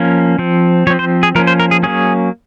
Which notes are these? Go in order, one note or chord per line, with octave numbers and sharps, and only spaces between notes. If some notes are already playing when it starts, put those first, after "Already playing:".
Already playing: F3 A#3 C#4
F3 C4
F3 C4 C#5
C5
G#4
F3 A#3 C#4 A#4
C5
A#4
G#4
F#3 A#3 C#4 G#4